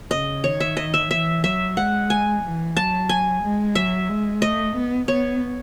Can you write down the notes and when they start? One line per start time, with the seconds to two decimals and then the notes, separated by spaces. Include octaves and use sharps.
0.11 C#3 D#5
0.44 D#3 C#5
0.60 E5
0.77 D#5
0.94 E5
1.11 E3 E5
1.44 F#3 E5
1.77 G#3 F#5
2.10 G#5
2.43 E3
2.76 F#3 A5
3.09 G#5
3.43 G#3
3.75 F#3 E5
4.09 G#3
4.42 A3 D#5
4.76 B3
5.08 B3 C#5